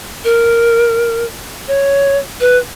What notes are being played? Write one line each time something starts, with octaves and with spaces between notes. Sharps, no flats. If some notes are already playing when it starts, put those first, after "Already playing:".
A#4
C#5
B4